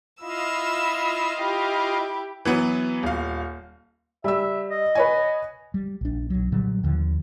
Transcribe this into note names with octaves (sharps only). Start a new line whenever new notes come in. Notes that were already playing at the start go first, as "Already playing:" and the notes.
E4 F4 D#5 F5 E6
E4 G4
E3 F#3 B3
D#1 F5
G3 E5 E6
D#5
B4 C#5 G#5
G3
A#1 D4
B1 F#3
A#2 D3 F#3 G3
D#2 D3 F3